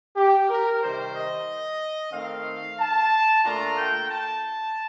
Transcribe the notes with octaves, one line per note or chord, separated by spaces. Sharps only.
G4
A#4
C3 D#3 G3 C5
D#5
D#3 A3 C4 F5
A5
A#2 A3 D4 F4 A#5
G5
A5